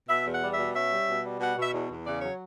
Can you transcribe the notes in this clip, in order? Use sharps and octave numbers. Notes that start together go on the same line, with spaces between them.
B2 E5
E2
F#5
G3
B2 E5
C#4 E5
G3
B2
G3
B2 F#5
B2
E5
E2
E2
C#3 D5
F#3 C#5